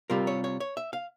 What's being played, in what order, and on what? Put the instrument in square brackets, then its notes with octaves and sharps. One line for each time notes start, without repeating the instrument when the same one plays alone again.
[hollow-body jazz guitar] C3 G3 C4 F4 A#4
C#5
C#5
C#5
E5
F5